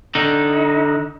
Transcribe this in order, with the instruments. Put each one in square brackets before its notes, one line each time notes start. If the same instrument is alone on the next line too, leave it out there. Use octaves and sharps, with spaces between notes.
[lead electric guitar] D3 D#4